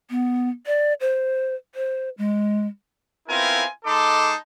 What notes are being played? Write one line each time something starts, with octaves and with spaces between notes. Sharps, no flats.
B3
D5
C5
C5
G#3
B3 C4 E4 F4 A#4 G#5
G#3 D#4 A4 A5 C6 D6